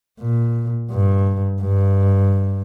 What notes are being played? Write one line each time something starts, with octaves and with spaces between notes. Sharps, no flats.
A#2
G2
G2